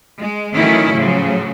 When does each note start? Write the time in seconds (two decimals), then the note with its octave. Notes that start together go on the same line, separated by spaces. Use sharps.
0.20 G#3
0.55 D#3 E3 F#3 A3 C#4 E4
0.94 A2 C#3 F3 F#3